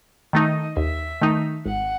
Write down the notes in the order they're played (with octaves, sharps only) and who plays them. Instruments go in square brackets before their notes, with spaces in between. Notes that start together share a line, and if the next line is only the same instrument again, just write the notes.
[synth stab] D#3 A3 D#4 [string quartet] D#5
[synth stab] D#2 [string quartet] E5
[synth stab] D#3 A3 D#4
[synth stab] G#1 [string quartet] F#5